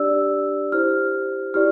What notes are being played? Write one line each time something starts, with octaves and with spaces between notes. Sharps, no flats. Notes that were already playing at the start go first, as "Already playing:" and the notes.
Already playing: D4 G4 D5 E6
E4 G4 C5 F6
E4 G4 D5 F6